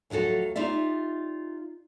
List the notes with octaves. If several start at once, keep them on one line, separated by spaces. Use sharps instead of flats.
D2 F3 F#3 F#4 A4
D#4 F4 G4 D5 E5